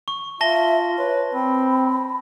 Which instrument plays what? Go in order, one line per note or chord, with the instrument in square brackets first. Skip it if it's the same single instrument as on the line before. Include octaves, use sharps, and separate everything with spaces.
[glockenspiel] C#6
[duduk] F4 [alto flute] E5 [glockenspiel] A5 A#6 G7
[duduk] B4 [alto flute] C#5
[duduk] C4 [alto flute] B5